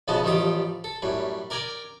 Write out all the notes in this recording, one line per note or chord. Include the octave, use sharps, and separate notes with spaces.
B1 C#3 F3 B3 D#5 A5
A1 D#3 F3 G3 G4 D#6
A4
F#2 A2 G3
A#4 D5 G5 G#5 A#5